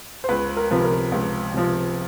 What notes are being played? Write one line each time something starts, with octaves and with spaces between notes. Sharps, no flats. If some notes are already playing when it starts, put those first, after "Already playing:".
C5
C#2 B4
A#4
C3 F3 B4
A#4
C#2
C3 F3